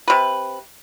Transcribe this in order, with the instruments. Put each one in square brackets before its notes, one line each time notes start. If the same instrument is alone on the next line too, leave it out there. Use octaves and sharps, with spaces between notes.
[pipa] C3 B4